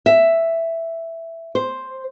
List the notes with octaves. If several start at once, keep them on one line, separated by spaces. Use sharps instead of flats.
E5
C5